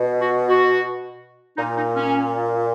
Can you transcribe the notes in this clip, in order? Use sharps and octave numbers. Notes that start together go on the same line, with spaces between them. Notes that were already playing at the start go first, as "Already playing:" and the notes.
Already playing: B2
F#4
F#4
A#2 D#4
D#4
C#4